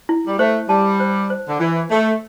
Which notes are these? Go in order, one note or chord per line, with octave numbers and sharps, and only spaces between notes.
E4
G3
A3 C5
G3 A5
C5
C5
D3
E3 E5
A3 E5